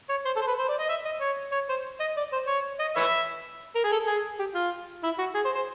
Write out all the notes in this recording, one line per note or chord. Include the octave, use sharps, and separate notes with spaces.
C#5
C5
A4
C5
B4
C5
D5
D#5
E5
D#5
C#5
C#5
C5
D#5
D5
C5
C#5
D#5
B4 C#5 E5
A#4
G#4
A4
G#4
G4
F4
E4
F#4
G#4
C5
C5